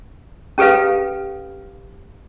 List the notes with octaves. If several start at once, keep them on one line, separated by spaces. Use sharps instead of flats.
C#4 G4 A4 B4 F5